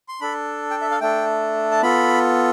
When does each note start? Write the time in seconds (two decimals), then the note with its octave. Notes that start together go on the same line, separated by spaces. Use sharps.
0.08 C6
0.21 D4 A4 B5
0.71 G5
0.81 E5
0.91 F5
1.01 A3 D4 A4 G5
1.71 A5
1.82 B3 F4 A4 B5